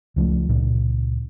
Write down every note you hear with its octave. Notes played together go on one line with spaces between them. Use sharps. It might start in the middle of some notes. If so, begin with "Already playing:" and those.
C#2 F3 A3
C#2 A#2